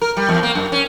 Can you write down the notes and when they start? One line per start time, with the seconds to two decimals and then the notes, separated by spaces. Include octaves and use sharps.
0.02 A#4
0.17 G3
0.29 E2
0.43 A#3
0.55 F#2
0.72 C#4